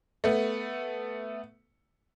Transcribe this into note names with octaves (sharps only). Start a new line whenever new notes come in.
A3 B3